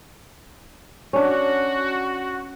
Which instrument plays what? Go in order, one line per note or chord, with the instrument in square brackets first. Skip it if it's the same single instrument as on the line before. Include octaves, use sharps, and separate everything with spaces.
[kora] C#4 D4 [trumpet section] F#4